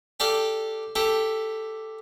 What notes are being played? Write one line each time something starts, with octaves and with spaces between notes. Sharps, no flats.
G4 A4 D5 F5
E4 G4 A4